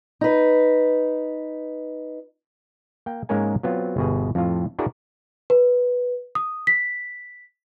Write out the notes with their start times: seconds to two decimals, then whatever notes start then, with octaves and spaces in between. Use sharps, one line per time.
0.21 D#4 B4
3.06 A#3 G5
3.29 G#2 G#3 A#3 C#4 A#4 G#5
3.63 F#3 B3 C4 F4
3.97 G1 B2 G#4
4.35 F2 A2 F4
4.79 D4 E4 F#4 G#4 A#4 D5
5.50 B4
6.35 D#6
6.67 B6